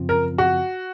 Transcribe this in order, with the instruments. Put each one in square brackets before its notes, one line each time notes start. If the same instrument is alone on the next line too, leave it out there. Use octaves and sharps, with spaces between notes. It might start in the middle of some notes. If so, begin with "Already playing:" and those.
Already playing: [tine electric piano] F#2 C#3 F3 C4 F4
[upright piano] A#4
F#4